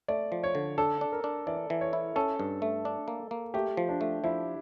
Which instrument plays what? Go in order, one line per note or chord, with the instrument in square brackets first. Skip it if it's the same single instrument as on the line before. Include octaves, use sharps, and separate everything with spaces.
[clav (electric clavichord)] A3 [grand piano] D5
[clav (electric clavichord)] F3
[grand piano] C#5
[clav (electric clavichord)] D3
[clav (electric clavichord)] D4 [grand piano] A4
[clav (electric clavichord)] D4
[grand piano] A#4
[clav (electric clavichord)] D4
[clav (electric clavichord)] E3 [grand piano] D5
[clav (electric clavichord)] E3
[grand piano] C#5
[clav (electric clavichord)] E4
[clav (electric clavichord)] C#4 [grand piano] A4
[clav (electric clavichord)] G2
A3
D4
A#3
A#3
[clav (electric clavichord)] A3 [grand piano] G4
[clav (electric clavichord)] F3
[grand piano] D4
[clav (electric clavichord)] A3
[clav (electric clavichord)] F3 [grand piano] E4